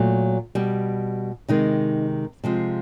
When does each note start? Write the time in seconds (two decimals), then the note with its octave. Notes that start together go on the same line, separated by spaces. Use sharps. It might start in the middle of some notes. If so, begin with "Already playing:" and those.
Already playing: A#2 F#3 A3
0.55 B2 G3
1.48 C3 D#3 G#3 D#4
2.44 C3 F3 G#3